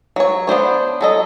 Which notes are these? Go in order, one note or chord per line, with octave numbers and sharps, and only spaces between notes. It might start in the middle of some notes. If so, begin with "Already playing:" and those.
F#3 C#5
B3 D4 C5 C#5
F#3 A4 D#5